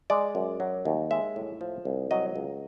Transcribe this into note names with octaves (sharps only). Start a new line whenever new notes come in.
G#3 D5
F#2
F#3
D#2
G#3 E5
A2
F3
C2
F#3 D#5
C#2